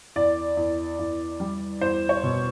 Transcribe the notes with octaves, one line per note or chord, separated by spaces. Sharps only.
E2 D5
E2
E2
G3
E2 C5
C#5
B2